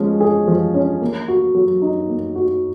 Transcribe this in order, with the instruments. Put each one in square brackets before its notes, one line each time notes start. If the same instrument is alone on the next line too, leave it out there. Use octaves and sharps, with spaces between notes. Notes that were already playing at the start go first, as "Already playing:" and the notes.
Already playing: [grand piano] F3 G#3 C#4
G#4
F3
C#4
A#3
F#4
F#3
D#4
A#3
F#4